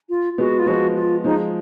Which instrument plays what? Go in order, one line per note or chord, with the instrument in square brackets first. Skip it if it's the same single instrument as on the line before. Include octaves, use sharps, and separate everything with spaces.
[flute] F4
[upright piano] G#3 B3 [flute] F#4
[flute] F4
[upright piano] F3 G#3 [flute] F#4
[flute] F4
[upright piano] F3 G#3 [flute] D#4